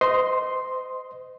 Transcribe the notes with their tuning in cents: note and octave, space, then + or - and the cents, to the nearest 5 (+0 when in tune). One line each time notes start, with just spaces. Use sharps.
C5 -35 D#5 +5 C6 +0